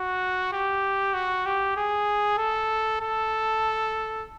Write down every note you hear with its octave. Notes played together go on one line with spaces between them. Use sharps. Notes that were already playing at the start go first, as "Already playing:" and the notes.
Already playing: F#4
G4
F#4
G4
G#4
A4
A4